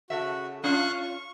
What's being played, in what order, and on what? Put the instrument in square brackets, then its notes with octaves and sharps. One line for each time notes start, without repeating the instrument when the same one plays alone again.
[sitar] C#3 A4 E5 [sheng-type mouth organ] F#4
[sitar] C#4 F4 [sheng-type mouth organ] F5 C#6 F#6
[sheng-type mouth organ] C#6